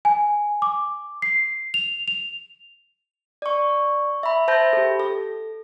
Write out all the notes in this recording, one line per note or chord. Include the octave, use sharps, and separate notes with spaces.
G#5
D6
C7
F7
F7
D5 C#6
E5 B5
C5 E5 A5 B5 G6 A#6
G4 A4
A4